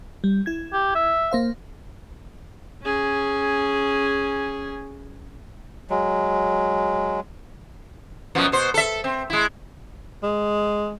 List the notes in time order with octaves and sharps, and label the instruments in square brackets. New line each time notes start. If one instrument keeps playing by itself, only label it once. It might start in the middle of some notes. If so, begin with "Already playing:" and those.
[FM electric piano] G3
E4 G#6
[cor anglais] G4
E5
[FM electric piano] A#3 C5 F5
[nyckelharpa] C#4 G#4
[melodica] F#3 G#3
[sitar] F#2 B2 F3
B2 C5
A4 E5
C4
G#3 E4
[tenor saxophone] G#3